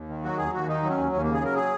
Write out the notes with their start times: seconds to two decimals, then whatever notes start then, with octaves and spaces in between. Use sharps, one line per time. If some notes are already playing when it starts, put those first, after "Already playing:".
Already playing: D#2
0.09 D#3
0.24 F#3 F#4
0.38 D#2 G#4
0.53 D#2 F#4
0.67 D#3 D#4
0.83 F#3
0.90 C#4
0.98 D#2
1.12 D#2 C#4
1.23 C#3 A#3
1.34 G#4
1.42 F#3 A#4
1.56 G#4